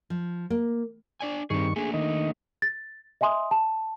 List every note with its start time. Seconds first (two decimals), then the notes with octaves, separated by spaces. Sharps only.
0.10 F3
0.50 A#3
1.20 D4 D5 G#5
1.50 G2 D#3 C4 G#4 C#6
1.76 A3 A#3 D4 G#4
1.94 D#3 D#5
2.62 A6
3.21 D#5 E5 G#5 C6 D#6
3.51 A5